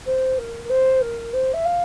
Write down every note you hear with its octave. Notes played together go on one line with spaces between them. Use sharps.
C5
A#4
A#4
C5
A#4
C5
E5
F5